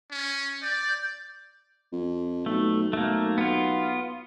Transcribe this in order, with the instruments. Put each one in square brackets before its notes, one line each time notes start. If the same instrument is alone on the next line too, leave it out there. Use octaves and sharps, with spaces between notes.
[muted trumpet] C#4
[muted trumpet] D5 [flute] G6
[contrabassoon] F2
[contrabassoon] B1 [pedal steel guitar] A3
[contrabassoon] B1 [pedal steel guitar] A3 A#3
[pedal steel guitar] B3 F4